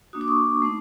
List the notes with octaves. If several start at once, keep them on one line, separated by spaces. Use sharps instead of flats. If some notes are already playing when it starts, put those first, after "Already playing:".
A#3 D4 F#4 D#6
D6
C#6 D#6
A3 C4 D#4